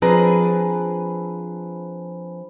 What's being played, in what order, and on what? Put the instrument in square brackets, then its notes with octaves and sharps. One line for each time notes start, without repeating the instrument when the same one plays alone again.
[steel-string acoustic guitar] F3 C4 D4 G#4 B4 A#5